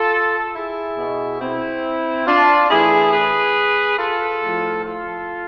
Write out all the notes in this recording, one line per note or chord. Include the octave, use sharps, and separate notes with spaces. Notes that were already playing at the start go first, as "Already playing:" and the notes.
Already playing: F4 A4
E4 G#4
B2
C4 E4
D4 F4
A2 E3 E4 G#4
G#4 B4
F4 A4
A2 F3
F4 A4